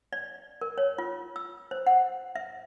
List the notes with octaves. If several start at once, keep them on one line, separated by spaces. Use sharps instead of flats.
D5
A#4
C#5
F4
E6
C5
F#5
E5